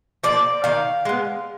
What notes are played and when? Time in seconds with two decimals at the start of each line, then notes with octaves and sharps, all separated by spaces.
0.23 F3 A#3 D5
0.64 D#3 F5
1.05 G#3 B3